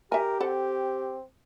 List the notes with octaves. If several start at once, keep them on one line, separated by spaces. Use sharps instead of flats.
G4 A#4 E5 G#5
C4 A4 F#5